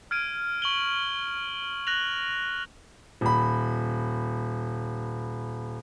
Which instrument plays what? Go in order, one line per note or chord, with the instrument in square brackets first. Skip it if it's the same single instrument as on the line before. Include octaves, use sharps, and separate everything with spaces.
[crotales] F6 G#6 D7 D#7
C#6 F#7 G7
F#6 A#6 F7 F#7
[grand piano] D#1 B5